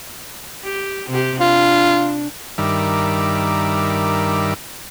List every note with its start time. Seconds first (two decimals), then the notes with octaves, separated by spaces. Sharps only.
0.64 G4
1.10 C3 G4
1.40 D4 F4
2.58 G2 D#3 G3 A#4 E5 D6